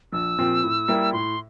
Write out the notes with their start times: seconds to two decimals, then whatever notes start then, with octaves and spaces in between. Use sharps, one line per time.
0.13 A#1 E6
0.38 A#2 F3 C4 G4
0.64 A2
0.88 G3 A#3 E4
1.13 A2 C6